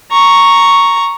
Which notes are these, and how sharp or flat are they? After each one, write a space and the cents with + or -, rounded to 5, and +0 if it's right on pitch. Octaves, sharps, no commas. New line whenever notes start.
A#5 +0 C#6 +0